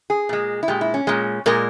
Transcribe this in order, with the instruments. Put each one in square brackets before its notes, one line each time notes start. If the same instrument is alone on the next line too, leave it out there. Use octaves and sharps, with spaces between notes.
[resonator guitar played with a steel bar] G#4
A#2 G#3
E4
A#2 G#3 G4
E4
C#4
A#2 G#3
A#2 G#3 A#4